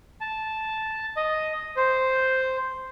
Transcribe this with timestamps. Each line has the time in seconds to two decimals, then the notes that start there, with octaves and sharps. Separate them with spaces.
0.21 A5
1.17 D#5
1.76 C5